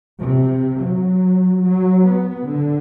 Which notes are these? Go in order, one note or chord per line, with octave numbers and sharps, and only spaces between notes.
C3
F#3
F#3
B3
D3